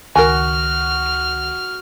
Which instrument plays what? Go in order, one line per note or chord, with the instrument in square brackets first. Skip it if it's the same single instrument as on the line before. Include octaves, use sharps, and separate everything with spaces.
[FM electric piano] C#2 D#3 [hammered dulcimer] F#4 [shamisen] A#4 G#5 [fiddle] F6